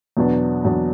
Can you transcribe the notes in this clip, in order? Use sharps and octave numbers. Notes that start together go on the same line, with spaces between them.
E2 B2 F#3 B3 D4
E2 B2 F#3 B3 D4